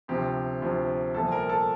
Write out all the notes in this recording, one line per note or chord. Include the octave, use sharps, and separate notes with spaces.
D2 C3 F3 G4
D2 C3 F3
C2 A#2 F3 A4
A#4
A4